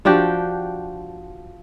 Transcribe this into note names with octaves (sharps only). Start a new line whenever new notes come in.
F3 D4 F#4 G4